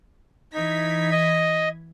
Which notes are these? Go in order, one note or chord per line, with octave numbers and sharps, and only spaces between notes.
E3 D#4 G#6 B6
D#5